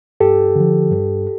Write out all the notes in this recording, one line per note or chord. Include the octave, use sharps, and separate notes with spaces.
G2 G4 A4
D3 F3
G2